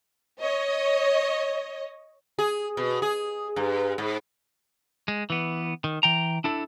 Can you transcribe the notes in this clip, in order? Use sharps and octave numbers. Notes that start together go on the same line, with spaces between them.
C#5 D#5
G#4
B2
G#4
G2
G#2
G#3
E3 B3
D#3
E3 G5 A#5
D4 E4 A4